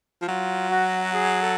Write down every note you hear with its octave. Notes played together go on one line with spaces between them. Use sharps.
F3
F#3 F4
F#4
G#4
A4